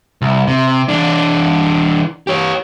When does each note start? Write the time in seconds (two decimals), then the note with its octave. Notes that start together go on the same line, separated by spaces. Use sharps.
0.22 C2
0.47 C3
0.88 E3 D4
2.27 G4 C#5